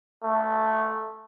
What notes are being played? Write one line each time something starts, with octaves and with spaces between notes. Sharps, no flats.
A3